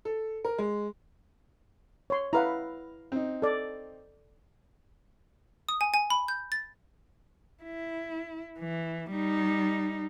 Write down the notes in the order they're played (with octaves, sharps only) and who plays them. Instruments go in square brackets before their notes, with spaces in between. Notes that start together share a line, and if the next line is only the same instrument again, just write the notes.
[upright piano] A4
A#4
G#3
[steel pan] C#5 C6
[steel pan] E4 B4 F#5 [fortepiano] F5 A#5
[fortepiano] C4 D#4
[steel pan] A4 D5
[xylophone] D#6
G#5
G#5
B5
G6
A6
[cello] E4
E3
G3 D#4